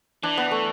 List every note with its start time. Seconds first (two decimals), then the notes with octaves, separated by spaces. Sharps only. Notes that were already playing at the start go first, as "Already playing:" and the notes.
0.23 E3 D4
0.37 B3
0.51 A3